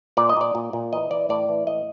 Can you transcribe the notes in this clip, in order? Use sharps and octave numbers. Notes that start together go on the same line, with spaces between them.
A#2 D5
D#5
A#2 D5
A#2
A#2
E3 D#5
E3 D5
A2 D5
E3
A2 D#5